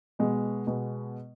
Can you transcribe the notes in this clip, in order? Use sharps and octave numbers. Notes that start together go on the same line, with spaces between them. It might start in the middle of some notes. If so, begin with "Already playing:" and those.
B2 G#3 B3
B2 G#3 B3